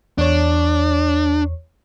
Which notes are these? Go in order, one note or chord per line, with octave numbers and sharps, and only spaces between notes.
E2 D4 C#5